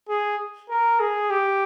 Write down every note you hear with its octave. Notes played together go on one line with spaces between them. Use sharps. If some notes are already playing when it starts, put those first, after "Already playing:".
G#4
A#4
G#4
G4